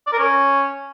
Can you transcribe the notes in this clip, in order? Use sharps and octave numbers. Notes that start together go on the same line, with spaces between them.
D5
A#4
C#4